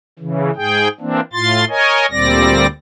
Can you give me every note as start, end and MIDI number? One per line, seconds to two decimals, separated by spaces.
0.19 0.51 49
0.19 0.51 52
0.56 0.88 44
0.56 0.88 68
0.56 0.88 79
1.00 1.20 52
1.00 1.20 58
1.00 1.20 60
1.00 1.20 62
1.33 1.65 45
1.33 1.65 65
1.33 1.65 84
1.33 1.65 93
1.69 2.06 70
1.69 2.06 73
1.69 2.06 75
1.69 2.06 80
2.11 2.67 38
2.11 2.67 46
2.11 2.67 55
2.11 2.67 60
2.11 2.67 74
2.11 2.67 94